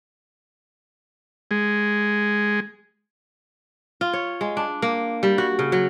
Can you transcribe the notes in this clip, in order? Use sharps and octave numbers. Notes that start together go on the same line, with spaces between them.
G#3
F4
C#5
G#3
D4
A#3
G3
F#4
C#3
F#3